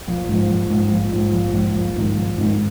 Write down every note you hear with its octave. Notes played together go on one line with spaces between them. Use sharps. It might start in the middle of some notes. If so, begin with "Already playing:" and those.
A#1
G#2 F3
A#1
G#2 F3
A#1
G#2 F3
A#1
G#2 F3
A#1
G#2 D#3
A#1
G#2 D#3